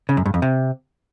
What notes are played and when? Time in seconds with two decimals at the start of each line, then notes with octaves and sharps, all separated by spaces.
0.09 C#3
0.17 F#2
0.26 G2
0.34 F2
0.42 C3